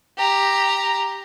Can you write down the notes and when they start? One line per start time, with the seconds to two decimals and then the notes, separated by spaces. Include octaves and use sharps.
0.18 G4 A#5